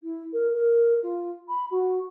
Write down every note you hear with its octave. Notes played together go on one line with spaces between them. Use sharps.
E4
A#4
A#4
F4
B5
F#4